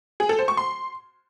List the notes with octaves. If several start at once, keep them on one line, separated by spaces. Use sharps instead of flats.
G#4
A4
C5
C#6
C6